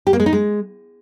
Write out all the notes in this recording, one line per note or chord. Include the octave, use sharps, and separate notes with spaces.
G4
A#3
G#3
D#4
G#3